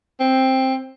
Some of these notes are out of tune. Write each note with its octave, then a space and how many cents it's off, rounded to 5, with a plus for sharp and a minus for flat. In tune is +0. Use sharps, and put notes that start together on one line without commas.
C4 +10